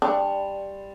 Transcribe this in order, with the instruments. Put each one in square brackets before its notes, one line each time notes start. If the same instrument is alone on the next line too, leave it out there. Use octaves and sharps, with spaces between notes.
[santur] G3 C6 C#6 [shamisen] D4